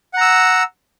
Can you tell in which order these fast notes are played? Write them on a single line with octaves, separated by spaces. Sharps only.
F#5 A#5 E6